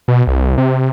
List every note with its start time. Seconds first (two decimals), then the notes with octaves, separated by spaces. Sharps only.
0.08 B2
0.27 C2
0.58 C3